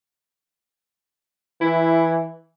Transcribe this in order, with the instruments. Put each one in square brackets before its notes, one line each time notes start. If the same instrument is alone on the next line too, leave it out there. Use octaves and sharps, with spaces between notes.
[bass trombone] E3 [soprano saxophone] E4